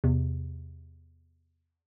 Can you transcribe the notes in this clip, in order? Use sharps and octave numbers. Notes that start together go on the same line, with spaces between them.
E2 C3